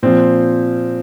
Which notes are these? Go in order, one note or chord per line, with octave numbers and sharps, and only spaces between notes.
A#2 F3 C4